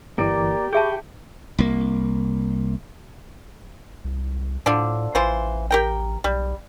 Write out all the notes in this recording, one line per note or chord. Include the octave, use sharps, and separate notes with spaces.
G1 E3 A#3 G4 D5
G#4 E5 G5 A5 B5 C#6 D6
C2 A#3
C2
A2 D3 F3 D4
A1 E3 F4 C5
G4 A#4 G5
B1 G3